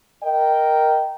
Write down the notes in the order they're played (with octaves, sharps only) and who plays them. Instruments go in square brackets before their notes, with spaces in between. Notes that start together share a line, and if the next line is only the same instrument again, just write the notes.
[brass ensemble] A#4 D#5 G5